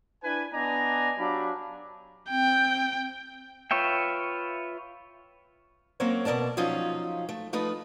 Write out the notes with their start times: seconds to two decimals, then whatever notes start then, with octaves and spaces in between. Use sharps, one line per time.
0.23 D4 E4 B4 G#5
0.53 B3 D4 D5 D#5 G#5 A#5
1.18 F#3 D4 G4 D5 F5 B5
2.30 C4 G5
3.71 F4 B4 C#5 E5 G5
6.00 F#3 A#3 C4 C#4 A#4 C#5
6.25 B2 F3 A#4 D5 A5
6.57 F3 F#3 C#4 D#4 F4
7.29 A3
7.53 F3 A3 D#4 F4 B4